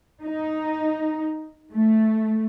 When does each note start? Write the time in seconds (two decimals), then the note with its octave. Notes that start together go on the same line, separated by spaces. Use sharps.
0.23 D#4
1.73 A3